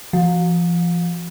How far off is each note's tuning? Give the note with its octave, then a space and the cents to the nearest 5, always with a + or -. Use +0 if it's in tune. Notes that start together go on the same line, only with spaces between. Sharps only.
F3 -30